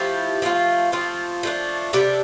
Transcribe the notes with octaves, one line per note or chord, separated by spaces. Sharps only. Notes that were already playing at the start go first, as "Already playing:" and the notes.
Already playing: F3 A3 E4 G4
F3 A3 D4 F4
F3 A3 C4 F4
F3 A3 D4
C3 G3 D4 A4